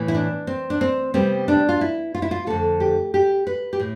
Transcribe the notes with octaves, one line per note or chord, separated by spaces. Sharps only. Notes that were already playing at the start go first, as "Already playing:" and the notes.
Already playing: A2 E3 B3
E4
D4
C4
D4
C4
C3 G3 B3 C4
D4
F4
E4
F4
E4
F4
F2 D3 A3 A4
G4
G4
B4
G4
A2